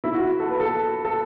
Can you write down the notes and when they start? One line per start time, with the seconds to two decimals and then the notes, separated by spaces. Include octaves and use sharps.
0.04 E4
0.14 F#4
0.40 A4
0.50 B4
0.60 A4
1.05 A4